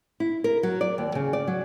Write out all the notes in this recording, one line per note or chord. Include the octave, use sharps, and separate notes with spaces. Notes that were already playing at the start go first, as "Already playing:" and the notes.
E4
A#4
F#3
D5
D#2
C#3
D5
F#3